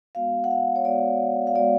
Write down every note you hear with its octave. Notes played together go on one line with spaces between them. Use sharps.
G#3 B3 F#4 F5
F#5
F5
C#5
G#3 B3 F#4 D5
F5
G#3 B3 F#4 D5